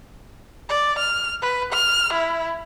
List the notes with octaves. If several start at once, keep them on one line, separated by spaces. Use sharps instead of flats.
D5
F6
B4
F6
E4